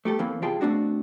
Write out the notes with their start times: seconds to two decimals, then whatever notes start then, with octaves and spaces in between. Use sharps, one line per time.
0.05 A3 G4 A4
0.19 E2 E3 A#3 C4
0.42 C3 G3 F4 G#4 G5 A5
0.61 B2 A3 C4 D4 F#4